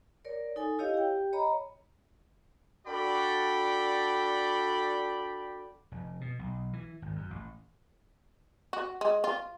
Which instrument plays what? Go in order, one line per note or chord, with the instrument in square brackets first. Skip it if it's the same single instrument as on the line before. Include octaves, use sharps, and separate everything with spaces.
[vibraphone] A#4 C#5 D5
D#4 A4 G#5
E4 G4 C#5 D#5 F5
G4 G5
C#5 D#5 A#5 B5
[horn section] D4 F#4 A4 D5 G5 B5
[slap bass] F1
B2
B1
E3
G#1
F#2
A1
[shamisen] F#4
G#3
F4